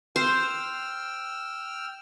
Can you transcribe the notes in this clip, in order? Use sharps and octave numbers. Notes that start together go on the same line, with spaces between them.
C5 G5 E6 F6